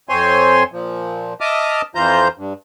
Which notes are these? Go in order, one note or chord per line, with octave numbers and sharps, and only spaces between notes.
F2 C4 C5 C#5 G#5 C6
A#2 F3
D#5 E5 A5 D6 D#6 F6
F2 E3 F4 C5 A#5 G6
G2